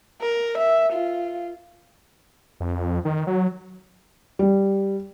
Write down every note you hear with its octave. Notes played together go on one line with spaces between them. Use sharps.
A#4
E5
F4
F2
D#3
F#3
G3